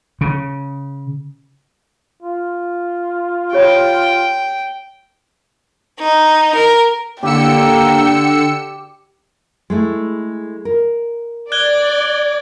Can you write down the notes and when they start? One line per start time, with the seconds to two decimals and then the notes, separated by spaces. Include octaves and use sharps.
0.21 C#3
2.22 F4
3.53 G4 C#5 G5 B5
6.00 D#4
6.55 A#4
7.23 D3 A#3 G4 G5 E6 C#7
9.70 G#3 A3 E4
10.65 A#4
11.52 D5 F#6 G#6 G7